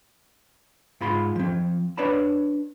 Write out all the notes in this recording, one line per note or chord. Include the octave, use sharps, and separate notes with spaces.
G#2 F4 B5 C6
F3 C4
D4 B4 C#5 D5 A5 B5